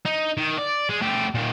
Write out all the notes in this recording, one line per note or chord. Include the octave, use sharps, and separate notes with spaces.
D#4
D#3
D5
G#3
A3 G4
A#2 D#3